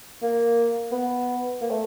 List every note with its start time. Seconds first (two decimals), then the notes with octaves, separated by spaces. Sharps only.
0.22 A#3
0.92 B3
1.61 A#3
1.70 A3